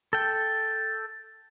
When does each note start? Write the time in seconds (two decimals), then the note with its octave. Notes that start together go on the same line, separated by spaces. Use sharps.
0.13 A4 G5